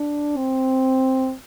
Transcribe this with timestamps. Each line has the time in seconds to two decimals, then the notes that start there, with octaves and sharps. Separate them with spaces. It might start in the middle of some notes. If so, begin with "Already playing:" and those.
Already playing: D4
0.37 C4